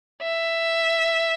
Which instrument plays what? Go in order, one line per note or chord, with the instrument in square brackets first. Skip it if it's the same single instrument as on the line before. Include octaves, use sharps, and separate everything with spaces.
[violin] E5